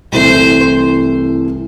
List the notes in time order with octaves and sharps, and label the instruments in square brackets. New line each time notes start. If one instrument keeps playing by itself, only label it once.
[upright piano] C2 C3 E3 A3 [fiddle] C5